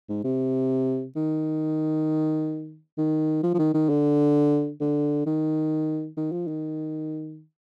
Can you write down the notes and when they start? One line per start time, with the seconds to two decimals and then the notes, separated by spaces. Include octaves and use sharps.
0.09 G#2
0.24 C3
1.16 D#3
2.98 D#3
3.43 F3
3.54 F3
3.59 D#3
3.74 D#3
3.89 D3
4.80 D3
5.26 D#3
6.17 D#3
6.32 F3
6.47 D#3